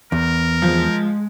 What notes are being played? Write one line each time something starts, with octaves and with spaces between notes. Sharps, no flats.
E2 A#4
F3 G#3